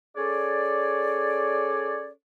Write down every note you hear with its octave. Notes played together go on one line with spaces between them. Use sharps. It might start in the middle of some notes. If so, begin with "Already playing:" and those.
C#4 G#4 A4 C#5 D5